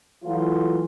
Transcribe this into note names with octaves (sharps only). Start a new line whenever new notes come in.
E3 F#3 A3 F4